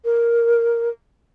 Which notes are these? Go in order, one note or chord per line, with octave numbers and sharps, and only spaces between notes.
A#4